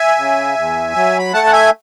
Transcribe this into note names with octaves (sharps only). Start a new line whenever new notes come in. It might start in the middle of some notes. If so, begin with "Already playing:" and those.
Already playing: E5 G#5
C#3
E2
F#3
B5
A3 F#5 A5
F#5
E5 G#5